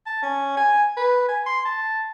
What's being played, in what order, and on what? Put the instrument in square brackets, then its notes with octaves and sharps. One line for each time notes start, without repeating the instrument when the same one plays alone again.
[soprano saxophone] A5
C#4
G#5
B4
G#5
C6
A5